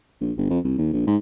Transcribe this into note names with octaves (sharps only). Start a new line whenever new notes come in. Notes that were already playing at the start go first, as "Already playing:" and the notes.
A#1
G1
F2
C2
D#2
A#1
G#2